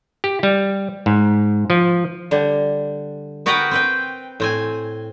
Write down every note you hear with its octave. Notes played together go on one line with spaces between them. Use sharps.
G4
G3
G#2
F3
D3 G3
B3 F#4 A#4 B4 F#5 G5
C4 B4 G5
A2 C4 G#5